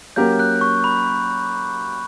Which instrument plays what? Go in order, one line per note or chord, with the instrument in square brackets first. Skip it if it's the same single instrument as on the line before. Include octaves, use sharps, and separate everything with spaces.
[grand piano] F#3 A#3 C#4 G4 A#4 [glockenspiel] G6
[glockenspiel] F#6
C#6
B5